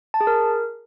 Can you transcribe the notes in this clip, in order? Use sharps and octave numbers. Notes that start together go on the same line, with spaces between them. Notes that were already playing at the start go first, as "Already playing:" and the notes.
A5
G#4
A#4